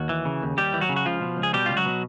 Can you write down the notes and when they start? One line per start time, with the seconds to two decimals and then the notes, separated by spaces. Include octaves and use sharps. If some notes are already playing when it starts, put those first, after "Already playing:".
Already playing: D#2 F#4
0.09 E3
0.25 C#3
0.42 D#2
0.57 D#2 G3 G4
0.74 E3
0.81 F#3 F#4
0.89 C#3
0.96 F#4
1.06 C#2 F3 F4
1.22 B2
1.37 C#2
1.43 G#4
1.53 B2 G3 G4
1.66 C#2 F4
1.77 F#3 F#4
1.86 B2